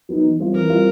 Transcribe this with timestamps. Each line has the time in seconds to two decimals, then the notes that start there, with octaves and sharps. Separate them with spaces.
0.09 F#3 B3 D#4
0.24 E3
0.39 G3 C4 F4
0.54 E3 A#4
0.69 G3 C4 F4